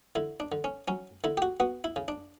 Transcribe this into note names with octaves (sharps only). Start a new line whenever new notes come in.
D3 E4
D4
D3
C#4
F#3 C#4
D3 E4
G4
F#4
B3 F#4
E4
C#3
D4